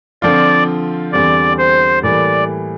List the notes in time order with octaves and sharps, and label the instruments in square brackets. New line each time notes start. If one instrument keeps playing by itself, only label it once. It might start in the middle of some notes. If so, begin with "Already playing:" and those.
[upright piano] D3 F3 C4 F4 [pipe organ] D5
[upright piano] E2 D3 G3 C4 [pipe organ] D5
[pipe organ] C5
[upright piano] A2 E3 G3 A#3 [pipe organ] D5